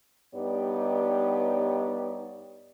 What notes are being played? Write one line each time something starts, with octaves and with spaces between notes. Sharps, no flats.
G2 B3 D#4 G4 C#5 D5